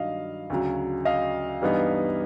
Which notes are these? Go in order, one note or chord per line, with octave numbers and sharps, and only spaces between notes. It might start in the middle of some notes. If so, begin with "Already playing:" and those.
Already playing: G2 D#3 F#3 D#5 F5
D2 C#3 F#3
D#5 F5
G2 E3 G3 B3 D#4